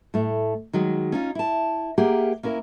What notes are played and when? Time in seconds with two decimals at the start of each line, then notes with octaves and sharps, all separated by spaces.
0.14 A2 A3
0.73 D#3 F#3 G#3
1.12 C#4 D#4 F4
1.35 E4 A5
1.98 A#3 G4 G#4 A#4 E5 F#5
2.43 A#3 C#4 E4 A#4